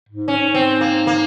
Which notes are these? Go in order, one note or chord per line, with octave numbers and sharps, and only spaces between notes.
G#2
C#4
C4
A#3
A#3